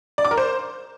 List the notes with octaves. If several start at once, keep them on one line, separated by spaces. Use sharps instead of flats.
D5
D6
A#4
C5